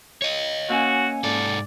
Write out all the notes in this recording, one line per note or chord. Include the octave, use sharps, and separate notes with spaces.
C#5 D#5
A#3 C#4 F#4 G#5
G#2 A4 D5